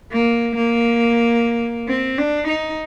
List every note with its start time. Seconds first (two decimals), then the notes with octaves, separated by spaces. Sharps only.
0.12 A#3
0.56 A#3
1.89 C4
2.18 D4
2.48 D#4